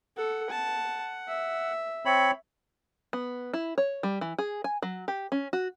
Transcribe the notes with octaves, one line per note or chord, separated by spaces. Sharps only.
A4 F#5
A5
E5
C4 C#5 B5
B3
E4
C#5
G3
E3
G#4
G#5
F#3
G4
C#4
F#4